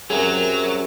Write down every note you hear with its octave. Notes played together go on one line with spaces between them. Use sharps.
F#2 C3 F#3 G#4 F7